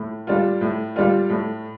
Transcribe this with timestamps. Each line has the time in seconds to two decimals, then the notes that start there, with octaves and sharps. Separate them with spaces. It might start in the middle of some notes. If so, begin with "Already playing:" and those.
Already playing: A2
0.27 G3 D4 F4
0.61 A2
0.96 G3 D4 F4
1.30 A2